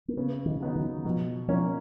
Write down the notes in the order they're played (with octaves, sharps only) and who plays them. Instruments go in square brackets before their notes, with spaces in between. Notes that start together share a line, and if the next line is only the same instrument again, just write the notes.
[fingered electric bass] A#3
[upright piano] C#3 [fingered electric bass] B3
[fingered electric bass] D#3
[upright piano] F#3 B3 D#4
[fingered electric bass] D#3
[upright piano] B2 [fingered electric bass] F3
[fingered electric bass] F3 [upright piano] A#3 C#4